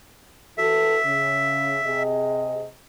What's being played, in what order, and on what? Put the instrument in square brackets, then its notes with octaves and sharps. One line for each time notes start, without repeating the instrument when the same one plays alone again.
[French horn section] E3 F#4 A4 [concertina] E5
[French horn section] C#3
C3 G#4 D#5